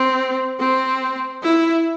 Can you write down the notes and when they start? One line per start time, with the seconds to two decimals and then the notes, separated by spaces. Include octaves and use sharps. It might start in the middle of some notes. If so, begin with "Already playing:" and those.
Already playing: C4
0.59 C4
1.43 E4